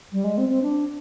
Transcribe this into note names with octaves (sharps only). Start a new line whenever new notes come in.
G3
G#3
C4
C4
D4